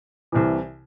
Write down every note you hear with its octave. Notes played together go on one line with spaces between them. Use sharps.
C2 C3 E3